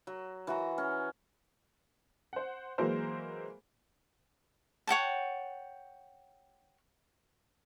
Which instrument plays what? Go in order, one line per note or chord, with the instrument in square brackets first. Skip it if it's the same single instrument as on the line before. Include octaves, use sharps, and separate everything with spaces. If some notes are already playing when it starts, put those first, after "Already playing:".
[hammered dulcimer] F#3
E3 F#4 A#5
C#4
[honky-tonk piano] C5 F#5
E3 F#3 G#3 A#3 A#4 C5
[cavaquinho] C#5 F#5 G5 A5